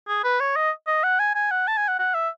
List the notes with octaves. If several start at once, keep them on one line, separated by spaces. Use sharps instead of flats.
G#4
B4
C#5
D#5
D#5
F#5
G#5
G#5
F#5
A5
G#5
F#5
F#5
E5